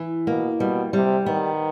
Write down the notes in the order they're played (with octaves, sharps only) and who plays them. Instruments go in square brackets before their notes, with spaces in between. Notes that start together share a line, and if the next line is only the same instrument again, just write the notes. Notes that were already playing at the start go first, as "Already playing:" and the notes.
Already playing: [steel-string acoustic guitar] E3
[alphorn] B2 [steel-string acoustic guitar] A#3
[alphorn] B2 [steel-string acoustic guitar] G3
[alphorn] C3 [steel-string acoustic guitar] G3
[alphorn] D#3 [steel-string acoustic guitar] B3